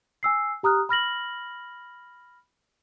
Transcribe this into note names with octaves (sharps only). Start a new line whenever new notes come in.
G#5 E6 C7
G4 A#5 D#6 F6 F#6
B5 F6 A#6 F#7